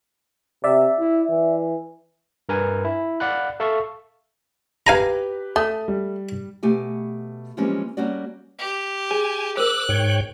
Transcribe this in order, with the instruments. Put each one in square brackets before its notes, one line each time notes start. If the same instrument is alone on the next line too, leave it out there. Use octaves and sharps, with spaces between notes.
[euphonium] C3 [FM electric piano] D5 E5
[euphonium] E4
E3
[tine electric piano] G2 A#4 B4 G#5
E4
D5 F5 F#5 B5 F#6
A4 E5 F5 A5 C#6
[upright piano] G4 B4 [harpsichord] F5 G#5 A#5
[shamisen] A3 [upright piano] D#6
[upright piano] G3
[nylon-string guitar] B2 A3 G4 G#5
E3 F3 G3 G#3 A#3 C#4
G3 A#3 C#4 F#4 D5
[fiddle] G4
[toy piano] G#4 [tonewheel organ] G#5
[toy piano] A#4 C5 [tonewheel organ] D6 E6 [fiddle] F#6
[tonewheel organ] G#2 C#5 G5